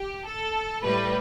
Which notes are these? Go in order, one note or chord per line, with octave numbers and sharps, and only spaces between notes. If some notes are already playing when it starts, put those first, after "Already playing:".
Already playing: G4
A4
A2 G3 B4